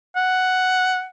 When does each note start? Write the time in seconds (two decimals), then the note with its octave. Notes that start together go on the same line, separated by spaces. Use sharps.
0.16 F#5